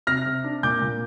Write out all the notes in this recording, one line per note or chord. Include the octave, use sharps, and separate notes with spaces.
C3 F6 A#6
C3
D4
A#2 D6 G6
A#2